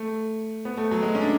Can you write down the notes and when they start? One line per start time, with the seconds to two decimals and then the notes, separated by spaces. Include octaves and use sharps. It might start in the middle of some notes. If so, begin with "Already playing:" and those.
Already playing: A3
0.65 B3
0.77 A3
0.91 F#3
1.02 G#3
1.15 C#4
1.21 D4